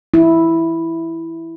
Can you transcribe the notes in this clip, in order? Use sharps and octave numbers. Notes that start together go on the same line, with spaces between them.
E4